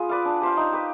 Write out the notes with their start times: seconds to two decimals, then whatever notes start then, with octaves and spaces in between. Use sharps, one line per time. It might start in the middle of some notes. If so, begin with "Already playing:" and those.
Already playing: B3 F4 G#4
0.09 B4 D5 F5
0.25 D4
0.41 G4 C5 F5
0.57 D#4
0.72 G4 B4